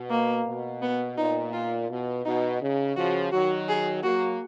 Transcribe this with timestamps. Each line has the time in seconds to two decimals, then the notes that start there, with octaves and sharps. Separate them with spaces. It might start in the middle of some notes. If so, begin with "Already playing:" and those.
Already playing: B2
0.10 A#3
0.46 B2
0.82 B3
1.17 A#2 D#4
1.53 F4
1.90 B2
2.26 B2 D#4
2.61 C#3
2.96 C#3 F3 F#4
3.32 D#3 F#3 F#4
3.69 G#4
4.03 F#3 A#3 F#4